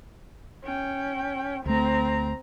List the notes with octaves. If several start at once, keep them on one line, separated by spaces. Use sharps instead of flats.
C#4 G5
D2 A3 C4 A#5